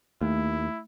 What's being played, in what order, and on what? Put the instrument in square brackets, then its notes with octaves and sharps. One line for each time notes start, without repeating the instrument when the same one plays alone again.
[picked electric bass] D#2 [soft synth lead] A3 [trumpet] E4